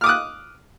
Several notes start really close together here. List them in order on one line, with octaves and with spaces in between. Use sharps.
F6 D6 D#6 F#6